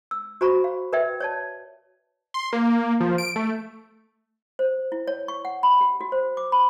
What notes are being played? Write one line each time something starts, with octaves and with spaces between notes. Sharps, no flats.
E6
F#4 C5 A#5 B5 C#6
F5
A#4 B4 D5 E5 G5
C#5 D5 A5
C6
A#3
F3
D7
A3
C5
E4
C#5
C#6
F#5
B5
G4
F#4
C5
D6
B5